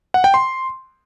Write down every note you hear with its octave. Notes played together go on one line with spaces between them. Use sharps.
F#5
G5
C6